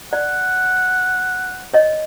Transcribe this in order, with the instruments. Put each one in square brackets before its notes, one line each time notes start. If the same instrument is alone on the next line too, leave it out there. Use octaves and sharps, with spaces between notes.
[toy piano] D5 [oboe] F#5
[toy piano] C#5 D#5